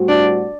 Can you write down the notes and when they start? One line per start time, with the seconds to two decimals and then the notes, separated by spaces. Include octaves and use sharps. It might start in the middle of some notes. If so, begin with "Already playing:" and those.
Already playing: A2 G3 C4 F#4
0.09 D4